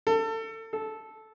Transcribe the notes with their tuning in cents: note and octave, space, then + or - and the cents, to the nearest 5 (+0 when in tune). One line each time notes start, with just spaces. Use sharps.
A4 +30
A4 -10